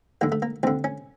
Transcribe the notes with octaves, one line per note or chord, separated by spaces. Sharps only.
D#2 D3 A#3
A3
A#3
D#2 D3 C4
C#4